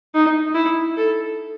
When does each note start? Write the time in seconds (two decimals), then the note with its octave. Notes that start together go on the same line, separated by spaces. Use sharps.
0.14 D#4
0.55 E4
0.97 A4